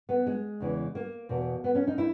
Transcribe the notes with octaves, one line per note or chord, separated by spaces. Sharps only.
B3
G#3
E2 C#3 E3
A#3
E2 B2
B3
C#4
D#4
E4